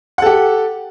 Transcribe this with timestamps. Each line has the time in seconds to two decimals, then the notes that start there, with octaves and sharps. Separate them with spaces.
0.18 F#5
0.22 A4
0.26 G4